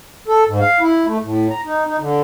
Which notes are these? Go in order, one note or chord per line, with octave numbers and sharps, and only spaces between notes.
A4
G#2
F5
E4
A3
A2
A#5
D#4
D#4
D3